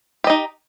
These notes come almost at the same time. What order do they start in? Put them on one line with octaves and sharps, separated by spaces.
G4 D#5 D#4